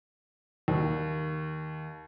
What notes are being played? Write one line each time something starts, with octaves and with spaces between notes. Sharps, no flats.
D#2